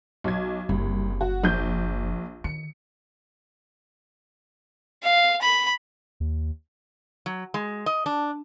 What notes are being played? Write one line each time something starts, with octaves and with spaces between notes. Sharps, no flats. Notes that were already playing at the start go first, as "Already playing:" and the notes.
B1 G#6
F#1 C2
F#4
A#1 G6
D#3 C#7
F5
B5
D#2
F#3
G#3
D#5
D4